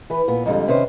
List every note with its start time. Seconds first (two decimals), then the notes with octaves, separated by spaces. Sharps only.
0.10 E3 B4
0.28 A#2 B3
0.46 F2 G#2 D3 G3
0.68 C3 D#3 C#4 B4 C5